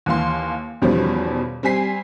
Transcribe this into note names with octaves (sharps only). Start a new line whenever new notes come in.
D#2 E3 F5 C6
E2 B2 D#3 F3 G3 C#4
G3 C4 G#5 B6 C7